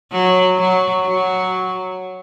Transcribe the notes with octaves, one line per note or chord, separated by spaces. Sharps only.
F#3
F#3
F#3